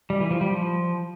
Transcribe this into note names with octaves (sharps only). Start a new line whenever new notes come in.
G3
E3
F3
G3
F3